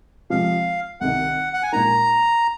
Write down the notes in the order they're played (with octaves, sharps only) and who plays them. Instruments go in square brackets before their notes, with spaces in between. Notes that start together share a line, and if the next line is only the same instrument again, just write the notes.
[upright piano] C3 F3 G#3 C4 [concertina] F5
[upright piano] C2 C3 D#3 [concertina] F#5
[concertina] F#5
G#5
[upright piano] A#2 G#3 D#4 A#4 [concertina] A#5